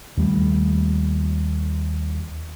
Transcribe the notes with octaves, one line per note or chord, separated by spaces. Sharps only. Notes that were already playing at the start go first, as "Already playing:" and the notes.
D#2 G3 A3